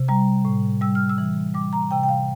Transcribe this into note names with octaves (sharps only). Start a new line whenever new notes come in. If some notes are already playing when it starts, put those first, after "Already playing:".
Already playing: C3
G3 A#5
A2
G3 E6
F6
E6
E3
G3 D6
A#5
C3 G5
G5
F5